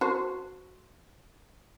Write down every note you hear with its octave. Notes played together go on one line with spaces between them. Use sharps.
F#4 C5